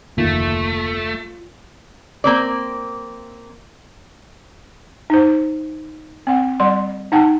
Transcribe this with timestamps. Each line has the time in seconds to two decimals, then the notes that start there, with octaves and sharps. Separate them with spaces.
0.18 F1 D2 D#3 A3 A#3 F4
2.24 A#3 C4 D5
5.10 D#4 C5
6.27 C4 F#5
6.60 G3 D5 F#5 C6
7.12 D#4 F#5 G5 A5